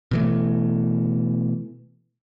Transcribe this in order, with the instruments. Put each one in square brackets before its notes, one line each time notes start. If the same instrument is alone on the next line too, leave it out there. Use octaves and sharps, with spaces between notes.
[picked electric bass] B2 E3 A3